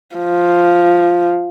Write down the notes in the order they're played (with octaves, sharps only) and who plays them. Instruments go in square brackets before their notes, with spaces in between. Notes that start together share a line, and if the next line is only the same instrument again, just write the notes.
[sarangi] F3